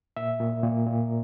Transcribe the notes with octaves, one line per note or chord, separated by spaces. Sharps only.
A#2 E5
A#2
A#2
A#2